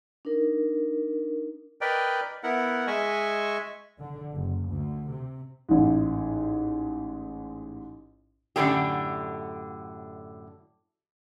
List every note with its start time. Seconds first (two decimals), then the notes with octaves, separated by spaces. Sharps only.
0.25 D4 D#4 A#4
1.81 A#4 B4 D5 D#5 G5
2.43 B3 E4 A#4 F#5
2.87 G#3 D#5 E5 G#5 C#6
4.00 D3
4.32 F#1
4.67 D2
5.08 C3
5.69 A1 G#2
8.56 F#2 A2 D3 D4 G4